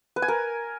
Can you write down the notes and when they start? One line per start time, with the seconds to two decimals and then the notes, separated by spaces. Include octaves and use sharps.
0.16 B4
0.22 G#5
0.28 A#4